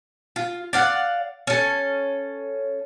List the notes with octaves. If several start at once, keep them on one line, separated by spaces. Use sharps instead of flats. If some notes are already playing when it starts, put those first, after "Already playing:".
F4
D5 F5 F#5
C#4 A4